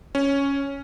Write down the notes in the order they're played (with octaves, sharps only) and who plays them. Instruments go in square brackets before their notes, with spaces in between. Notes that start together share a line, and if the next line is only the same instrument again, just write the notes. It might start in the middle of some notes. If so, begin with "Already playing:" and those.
[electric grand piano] C#4